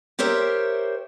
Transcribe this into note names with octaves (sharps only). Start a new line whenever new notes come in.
G4 A#4 C5 C#5 E5 G5